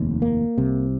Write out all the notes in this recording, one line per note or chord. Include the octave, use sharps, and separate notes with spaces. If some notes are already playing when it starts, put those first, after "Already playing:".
Already playing: F1 D#2
A#3
C2 C3